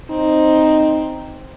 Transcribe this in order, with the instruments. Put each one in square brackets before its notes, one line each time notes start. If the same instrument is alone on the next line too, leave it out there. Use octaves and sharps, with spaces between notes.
[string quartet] C4 [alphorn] D#4